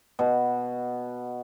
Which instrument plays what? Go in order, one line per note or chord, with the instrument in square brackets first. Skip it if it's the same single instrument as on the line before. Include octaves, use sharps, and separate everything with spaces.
[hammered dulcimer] B2